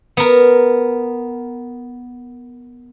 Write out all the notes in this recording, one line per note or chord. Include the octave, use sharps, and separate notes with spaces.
B3 A#4